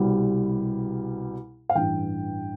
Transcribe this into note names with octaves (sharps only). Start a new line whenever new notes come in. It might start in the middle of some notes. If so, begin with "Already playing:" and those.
Already playing: C2 B2 G3
F5
A1 G2 E3 G5